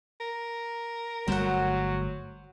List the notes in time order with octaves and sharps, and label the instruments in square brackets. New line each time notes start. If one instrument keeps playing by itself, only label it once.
[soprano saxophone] A#4
[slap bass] G1 G3 A3 [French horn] F#3 [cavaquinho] C5 F#5